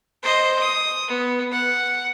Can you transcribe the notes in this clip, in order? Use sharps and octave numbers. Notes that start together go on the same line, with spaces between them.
C5 D#5
D#6
B3
F#5